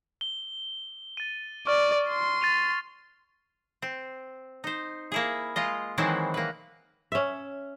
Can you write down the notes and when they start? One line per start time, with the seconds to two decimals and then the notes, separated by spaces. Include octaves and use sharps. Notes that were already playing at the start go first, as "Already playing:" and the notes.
0.21 G7
1.17 A6 D#7
1.67 D5 C#6 F6
2.09 C6
2.41 A6 D#7 F7
3.82 C4
4.64 D#4 C5
5.12 A#3 E4 G#4
5.56 G#3 F4 D#5
5.98 D#3 E3 F#3 G#3 C4 E4
6.34 A#3 B4
7.12 C#4 E5